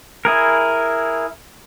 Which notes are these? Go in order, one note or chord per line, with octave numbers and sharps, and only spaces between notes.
E4 G#4 A#4